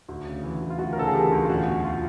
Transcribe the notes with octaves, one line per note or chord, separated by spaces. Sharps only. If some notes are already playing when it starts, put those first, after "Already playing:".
D2
C#3
E3
D2
F4
D2 F#4
A#4
C#3 A4
G#4
E3 G4
D2
F4
E2 F#4
B2
F4